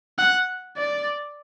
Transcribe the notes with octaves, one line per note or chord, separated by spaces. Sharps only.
F#5
D5